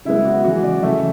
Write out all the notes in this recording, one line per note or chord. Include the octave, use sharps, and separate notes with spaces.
C#3 G#3 B3 E4
F#4
C#3 E3 G#3 F#4
D5
C#3 E3 A3 E5